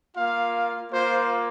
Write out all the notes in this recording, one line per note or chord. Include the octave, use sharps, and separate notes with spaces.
A#3 F4 F5
A#3 F4 C5